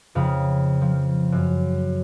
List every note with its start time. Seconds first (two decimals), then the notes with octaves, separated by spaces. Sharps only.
0.15 F2 C#3 F5 B5 D#6
0.81 F3
1.32 F#2